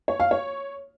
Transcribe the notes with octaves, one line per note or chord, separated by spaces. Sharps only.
C#5
F5
C#5